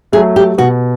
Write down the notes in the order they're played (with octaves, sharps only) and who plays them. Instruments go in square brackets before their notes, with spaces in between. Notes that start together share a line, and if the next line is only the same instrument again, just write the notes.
[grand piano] A3 [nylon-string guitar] G#4
[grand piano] F#3
[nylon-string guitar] G4
[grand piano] B2 [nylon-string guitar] F#4